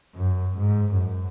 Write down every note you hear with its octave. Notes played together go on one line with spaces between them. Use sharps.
F#2
G#2
F#2